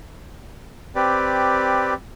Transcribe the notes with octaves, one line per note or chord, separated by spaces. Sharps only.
C4 G4 B4 D5